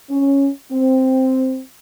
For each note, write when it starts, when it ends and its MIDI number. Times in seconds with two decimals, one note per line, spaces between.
0.10 0.49 61
0.72 1.61 60